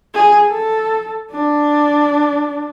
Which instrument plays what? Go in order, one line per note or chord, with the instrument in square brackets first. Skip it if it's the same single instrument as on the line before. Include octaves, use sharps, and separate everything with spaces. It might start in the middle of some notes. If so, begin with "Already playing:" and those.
[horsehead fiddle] G#4
A4
D4